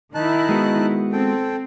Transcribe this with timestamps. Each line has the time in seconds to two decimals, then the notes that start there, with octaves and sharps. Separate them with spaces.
0.15 D#3 D#4 E4 A5 F#6
0.49 G#3 B3 F#4
1.13 C4 A4 G5